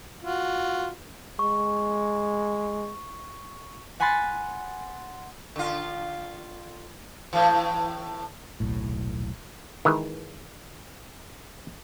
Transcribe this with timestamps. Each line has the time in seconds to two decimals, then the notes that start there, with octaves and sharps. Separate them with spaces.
0.23 F4 F#4
1.39 G#3 C#6
4.00 F#5 G#5 B5 C6 F#6 A6
5.56 D3 F4
7.33 A2 E3
8.60 D#1 B1 A2
9.85 D#3 E3 G#3 B4